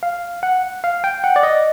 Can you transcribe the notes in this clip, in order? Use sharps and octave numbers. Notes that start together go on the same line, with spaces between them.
F5
F#5
F5
G5
F#5
D5
D#5